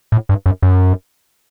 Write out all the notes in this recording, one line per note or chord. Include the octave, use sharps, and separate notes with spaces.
A2
G2
F#2
F#2